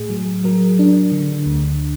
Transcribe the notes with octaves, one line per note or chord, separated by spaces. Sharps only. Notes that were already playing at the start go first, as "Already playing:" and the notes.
Already playing: A2 G#4
F#3
F#3 A#4
D4
D3
D2